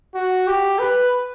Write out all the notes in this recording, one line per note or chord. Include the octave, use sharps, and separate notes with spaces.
F#4
G4
B4